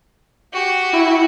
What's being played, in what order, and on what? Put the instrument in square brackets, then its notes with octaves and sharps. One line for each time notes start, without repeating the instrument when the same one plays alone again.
[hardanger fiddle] F#4 G4
[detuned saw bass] E4